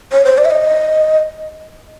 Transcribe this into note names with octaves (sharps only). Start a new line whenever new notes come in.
C#5
C5
D5
E5
D#5